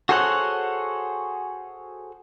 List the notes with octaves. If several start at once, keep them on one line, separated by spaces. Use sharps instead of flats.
F#4 G#4 A4 C5 C#5 F#5